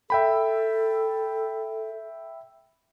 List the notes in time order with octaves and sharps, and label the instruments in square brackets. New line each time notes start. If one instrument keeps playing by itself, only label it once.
[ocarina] A4 [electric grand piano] E5 G5 B5